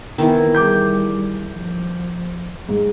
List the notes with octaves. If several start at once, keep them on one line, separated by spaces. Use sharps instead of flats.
D#3 E3 B3 E4
G3 G#4 D6 G6
F3
G#2